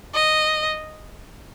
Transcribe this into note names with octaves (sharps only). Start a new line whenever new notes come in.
D#5